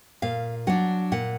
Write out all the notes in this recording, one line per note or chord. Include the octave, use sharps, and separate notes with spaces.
A#2 F5
F#3 D4 F#5
A#2 F#5